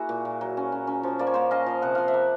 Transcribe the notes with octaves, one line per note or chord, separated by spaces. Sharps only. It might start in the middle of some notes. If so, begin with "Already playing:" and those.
Already playing: A#3 E4 F#4 G#4
A#2
A#2
F#3
C#4
C#4
C#4
F3
A#3 D5
C#5
A#3 C5 D5
C#4 D#5 F5
F3
C3 F#5
F3 F5
E5 F#5
A#3